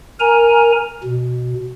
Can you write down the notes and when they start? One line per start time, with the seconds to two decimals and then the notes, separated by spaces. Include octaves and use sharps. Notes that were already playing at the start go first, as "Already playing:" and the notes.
0.20 A#4 G#5 A#5
1.04 B2